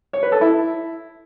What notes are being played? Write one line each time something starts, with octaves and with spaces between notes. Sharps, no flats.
C#5
B4
A4
E4